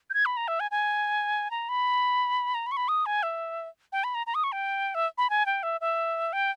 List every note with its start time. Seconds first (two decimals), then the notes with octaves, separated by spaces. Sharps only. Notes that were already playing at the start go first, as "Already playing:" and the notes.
0.10 G6
0.14 G#6
0.26 B5
0.37 A#5
0.48 E5
0.60 G#5
0.71 G#5
1.51 A#5
1.69 B5
2.54 A#5
2.67 B5
2.72 C#6
2.77 B5
2.88 D#6
3.06 G#5
3.23 E5
3.92 G5
4.04 B5
4.15 A#5
4.27 A#5
4.35 D#6
4.44 C#6
4.52 G5
4.95 E5
5.18 B5
5.30 G#5
5.46 G5
5.63 E5
5.81 E5
6.33 G5